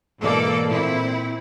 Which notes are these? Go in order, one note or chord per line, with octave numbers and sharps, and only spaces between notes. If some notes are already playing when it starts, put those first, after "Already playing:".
G#2 B2 E3 A#3 A4 D5
A#2 C4 E4